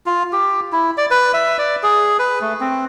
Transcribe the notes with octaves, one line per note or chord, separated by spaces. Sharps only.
F4
G4
E4
D5
B4
E5
D5
G#4
B4
A3
C4